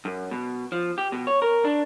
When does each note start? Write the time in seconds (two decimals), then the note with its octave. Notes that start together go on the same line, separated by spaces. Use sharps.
0.05 F#2
0.31 B2
0.72 F3
0.98 G4
1.12 B2
1.27 C#5
1.42 A#4
1.65 D4